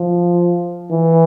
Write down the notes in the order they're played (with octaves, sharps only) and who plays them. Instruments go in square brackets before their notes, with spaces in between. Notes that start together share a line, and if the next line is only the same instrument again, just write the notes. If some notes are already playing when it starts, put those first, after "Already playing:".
Already playing: [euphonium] F3
E3